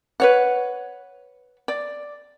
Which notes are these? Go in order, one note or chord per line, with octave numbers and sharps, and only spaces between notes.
B4 C#5 F#5
D5